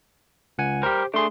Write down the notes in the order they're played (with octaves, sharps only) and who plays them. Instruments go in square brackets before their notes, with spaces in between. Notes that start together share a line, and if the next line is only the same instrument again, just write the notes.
[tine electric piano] C#2 F#5 G#5
[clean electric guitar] G3 A#4 [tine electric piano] G4 C5
[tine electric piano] A3 G#4 [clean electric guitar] D4 C6